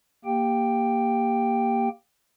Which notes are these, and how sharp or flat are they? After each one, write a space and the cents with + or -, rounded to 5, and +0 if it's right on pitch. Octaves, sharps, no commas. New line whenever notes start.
A#3 +0 G4 +10 G5 +0